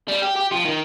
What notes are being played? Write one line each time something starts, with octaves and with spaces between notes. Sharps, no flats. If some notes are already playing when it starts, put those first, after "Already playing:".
G3
G4
G4
F3
D#3